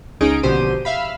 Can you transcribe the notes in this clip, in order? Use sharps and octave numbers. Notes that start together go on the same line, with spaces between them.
C#2 C#4 D#4 G#4 D7
A#1 B2 D3 G4 C5 D#7
E5 F5 B5